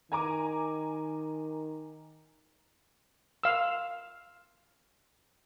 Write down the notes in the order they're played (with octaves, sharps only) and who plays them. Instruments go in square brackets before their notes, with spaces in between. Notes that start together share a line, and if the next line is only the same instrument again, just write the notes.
[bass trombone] D#3 [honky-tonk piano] G#5 A#5 D6
[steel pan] F5 E6